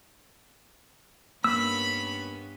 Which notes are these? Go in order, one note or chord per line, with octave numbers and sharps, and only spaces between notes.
G2 A#3 B3 C#4 B5 E6